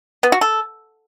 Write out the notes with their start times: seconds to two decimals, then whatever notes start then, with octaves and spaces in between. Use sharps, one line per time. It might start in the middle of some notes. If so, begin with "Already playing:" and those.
0.23 B3
0.32 F#4
0.41 A4